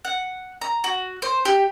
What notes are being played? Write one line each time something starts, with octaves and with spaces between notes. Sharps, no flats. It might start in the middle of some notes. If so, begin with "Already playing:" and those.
F#5
A#5
F#4
C5
G4